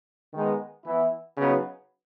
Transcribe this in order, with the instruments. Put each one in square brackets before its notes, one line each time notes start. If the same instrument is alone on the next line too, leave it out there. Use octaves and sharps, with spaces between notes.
[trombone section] D#3 G#3 B3 D#4
E3 B3 E4
C#3 F#3 B3 D#4